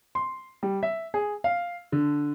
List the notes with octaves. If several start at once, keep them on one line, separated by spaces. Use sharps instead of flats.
C6
G3
E5
G#4
F5
D3